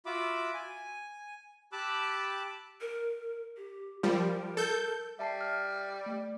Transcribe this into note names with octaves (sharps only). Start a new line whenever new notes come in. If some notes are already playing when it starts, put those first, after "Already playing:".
F4 F#4 E5 B5 D6
G#5
G4 A5 B5 D6 E6 F#6
A#4
G4
F3 G3 A#4
A4 G6
G3 E5 A5 C7
F6
A3 D5